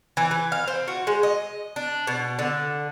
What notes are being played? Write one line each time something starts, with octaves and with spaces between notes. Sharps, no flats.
E3
E3
F5
C4
F#4
G#3
D#5
D4
B2
D3